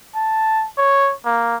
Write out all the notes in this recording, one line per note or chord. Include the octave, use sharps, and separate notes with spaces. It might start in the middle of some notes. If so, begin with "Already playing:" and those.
A5
C#5
A#3